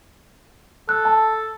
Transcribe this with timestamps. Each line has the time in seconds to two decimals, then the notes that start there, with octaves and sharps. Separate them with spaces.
0.89 A4 F#6
1.05 A5